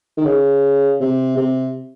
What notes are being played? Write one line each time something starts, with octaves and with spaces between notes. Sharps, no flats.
D#3
C#3
C3
C3